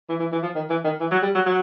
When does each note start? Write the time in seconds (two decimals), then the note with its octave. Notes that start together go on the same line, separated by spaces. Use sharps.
0.09 E3
0.20 E3
0.32 E3
0.43 F3
0.55 D#3
0.70 E3
0.84 D#3
1.00 E3
1.12 F#3
1.23 G3
1.35 F#3
1.46 F#3